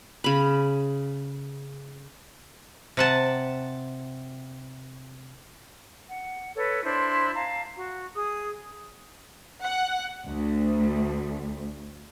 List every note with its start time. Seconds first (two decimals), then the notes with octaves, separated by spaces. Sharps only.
0.24 C#3 B5
2.97 C3 F#5 A5
6.08 F#5
6.55 A4 B4 C#5
6.83 D4 E4 C5 C6
7.34 F5 A5 A#5
7.75 F#4
8.15 G#4 D#6
9.63 F#5
10.26 D2